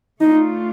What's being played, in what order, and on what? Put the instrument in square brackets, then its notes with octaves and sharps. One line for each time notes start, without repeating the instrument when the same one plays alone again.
[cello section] A3 D4 F4 [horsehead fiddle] D#4